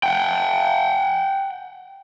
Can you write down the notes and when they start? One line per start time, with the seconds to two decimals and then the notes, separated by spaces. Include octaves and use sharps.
0.03 F#5 G5